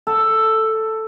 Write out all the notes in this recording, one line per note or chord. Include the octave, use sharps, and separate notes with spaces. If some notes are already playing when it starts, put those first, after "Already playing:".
A4